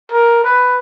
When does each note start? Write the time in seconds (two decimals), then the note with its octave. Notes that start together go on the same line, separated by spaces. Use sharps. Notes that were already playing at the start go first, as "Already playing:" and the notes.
0.11 A#4
0.44 B4